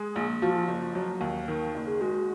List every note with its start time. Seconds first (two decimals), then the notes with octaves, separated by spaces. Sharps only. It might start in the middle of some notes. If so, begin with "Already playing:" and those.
Already playing: G#3 G#4
0.16 A#1
0.42 F3 F#4
0.55 F4
0.68 F#1
0.95 F#3
1.21 D#2
1.48 D#3
1.75 F#1
1.87 G#4
2.01 G#3 F#4